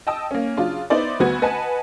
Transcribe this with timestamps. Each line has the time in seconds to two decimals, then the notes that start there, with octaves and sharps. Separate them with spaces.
0.07 D#5 G5 A5 D#6 E6
0.31 A#3 C#4
0.57 C#3 F#3 D4 F4
0.90 B3 D#4 E4 C5 D5
1.20 D2 B3 F#4 B4 G#6
1.42 B4 D#5 F#5 G#5 A5